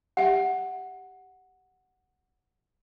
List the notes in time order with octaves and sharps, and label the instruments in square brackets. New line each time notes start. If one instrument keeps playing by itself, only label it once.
[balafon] G4 E5 [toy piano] F#5